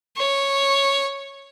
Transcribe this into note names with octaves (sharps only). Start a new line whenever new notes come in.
C#5